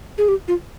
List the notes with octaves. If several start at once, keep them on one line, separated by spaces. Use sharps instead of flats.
G#4
G4
F4